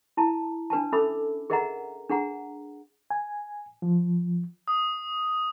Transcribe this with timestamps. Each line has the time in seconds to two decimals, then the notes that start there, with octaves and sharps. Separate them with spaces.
0.17 E4 A5 A#5
0.70 D4 B4 G#5 A5
0.92 C#4 A4 E5 B5 D6 E6
1.50 G#4 A#4 D#5 E5 F#5 A#5
2.09 D4 G#4 F#5 A#5
3.10 G#5
3.82 F3
4.68 D#6